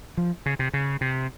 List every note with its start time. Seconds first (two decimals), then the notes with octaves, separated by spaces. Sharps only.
0.17 F3
0.46 C#3
0.59 C3
0.74 C#3
1.01 C3